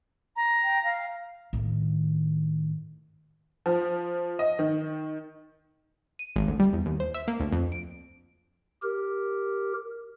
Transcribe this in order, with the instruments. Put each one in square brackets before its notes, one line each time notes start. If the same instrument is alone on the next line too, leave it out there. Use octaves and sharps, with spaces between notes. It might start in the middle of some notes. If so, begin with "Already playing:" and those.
[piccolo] A#5
[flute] G5
F5
[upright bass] A2 D#3
[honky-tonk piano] F3
D#5
D#3
[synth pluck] D#7
G#1
D2
G3
E2
D#2
C5
E5
A#3
D2
F2
D7
[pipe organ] G4 A#4